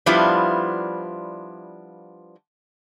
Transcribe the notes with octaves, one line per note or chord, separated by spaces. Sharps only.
F3 G3 B3 D4 E4 F4